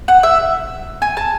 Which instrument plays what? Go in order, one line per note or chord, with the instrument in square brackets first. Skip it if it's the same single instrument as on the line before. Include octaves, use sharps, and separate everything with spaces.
[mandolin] F#5
E5
G#5
A5